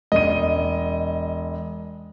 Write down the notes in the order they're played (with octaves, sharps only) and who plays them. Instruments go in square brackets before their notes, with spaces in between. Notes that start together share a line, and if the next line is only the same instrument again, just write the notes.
[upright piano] E1 D#7 [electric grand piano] D#5